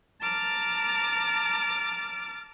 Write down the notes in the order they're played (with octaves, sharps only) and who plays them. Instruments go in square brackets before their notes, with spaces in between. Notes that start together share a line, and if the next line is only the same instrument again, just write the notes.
[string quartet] A5 A#5 D6 F6